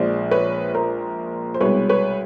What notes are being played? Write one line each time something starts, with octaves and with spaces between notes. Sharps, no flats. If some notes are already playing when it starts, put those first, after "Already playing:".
Already playing: A#1 A#2 F3 G#3 C5 D5
B4 C#5
A#4 C5
C5
C2 B2 G#3 B4 C#5
B4 C#5